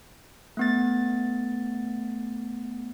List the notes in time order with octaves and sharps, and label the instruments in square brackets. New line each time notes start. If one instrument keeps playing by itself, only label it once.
[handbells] A3 B3 A6